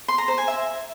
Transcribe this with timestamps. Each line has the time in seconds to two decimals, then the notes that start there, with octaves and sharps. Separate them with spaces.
0.08 C6
0.18 A#5
0.28 C5
0.38 G#5
0.48 E5